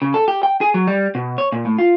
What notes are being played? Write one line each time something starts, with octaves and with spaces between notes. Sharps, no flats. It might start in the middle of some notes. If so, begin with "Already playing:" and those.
C#3
A4
G4
G5
G#4
F#3
G3
B2
C#5
A#2
A2
F4